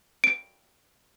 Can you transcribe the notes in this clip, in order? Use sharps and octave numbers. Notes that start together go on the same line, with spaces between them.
D7